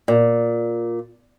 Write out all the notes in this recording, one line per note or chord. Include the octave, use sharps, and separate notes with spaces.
A#2